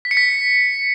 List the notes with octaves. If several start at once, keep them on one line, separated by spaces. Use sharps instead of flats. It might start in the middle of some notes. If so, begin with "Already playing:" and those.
B6
C#7
B6